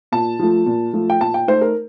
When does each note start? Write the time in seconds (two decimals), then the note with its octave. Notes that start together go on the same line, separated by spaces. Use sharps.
0.12 A#2 A5
0.39 F3 A3
0.66 A#2
0.93 F3 A3
1.10 G5
1.21 A#2 A5
1.34 G5
1.48 A3 D#4 C5
1.61 A#4